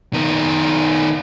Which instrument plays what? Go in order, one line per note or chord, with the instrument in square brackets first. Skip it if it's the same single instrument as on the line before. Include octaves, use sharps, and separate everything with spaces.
[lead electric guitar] D#3 B3